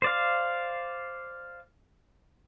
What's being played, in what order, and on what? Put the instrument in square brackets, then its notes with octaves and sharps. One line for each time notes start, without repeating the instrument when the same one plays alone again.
[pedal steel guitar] C5 D5 F5